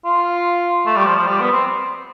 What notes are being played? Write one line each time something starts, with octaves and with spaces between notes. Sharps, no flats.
F4
A3
G3
F3
F3
G3
B3
C4